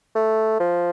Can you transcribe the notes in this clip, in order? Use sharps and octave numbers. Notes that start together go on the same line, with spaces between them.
A3
F3